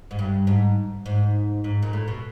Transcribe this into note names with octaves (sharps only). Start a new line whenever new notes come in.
G#2
G2
G#2
G#2
G#2
A#2
A2
B2